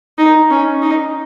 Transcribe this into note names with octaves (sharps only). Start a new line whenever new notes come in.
D#4
C#4
D#4